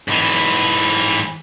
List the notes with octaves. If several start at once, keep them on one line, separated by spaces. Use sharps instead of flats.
G#2 E3